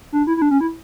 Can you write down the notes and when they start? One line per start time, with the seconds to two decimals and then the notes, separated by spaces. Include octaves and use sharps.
0.12 D4
0.27 E4
0.37 E4
0.42 D4
0.51 C#4
0.61 E4